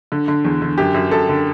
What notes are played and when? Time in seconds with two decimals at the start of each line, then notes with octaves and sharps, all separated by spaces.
0.12 D3
0.28 D3
0.45 E2
0.62 D3
0.78 F#2 G4
0.94 F#2
1.11 F#2 A4
1.29 D3